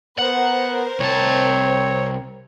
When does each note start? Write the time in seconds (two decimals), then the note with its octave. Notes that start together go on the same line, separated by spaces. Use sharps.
0.19 B3 A#4 C5 F#5
1.00 C2 C4 C#5 A5